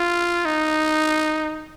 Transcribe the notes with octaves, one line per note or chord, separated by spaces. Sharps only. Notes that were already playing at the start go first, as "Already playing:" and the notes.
Already playing: F4
D#4